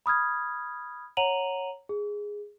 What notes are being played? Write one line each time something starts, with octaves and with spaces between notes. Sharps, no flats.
B5 D#6 F6 G#6
C#5 F#5 A#5 D#7 F7 F#7
G#4